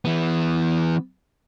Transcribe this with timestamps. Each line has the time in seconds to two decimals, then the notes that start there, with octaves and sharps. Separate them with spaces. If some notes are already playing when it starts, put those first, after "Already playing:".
0.05 E3 B3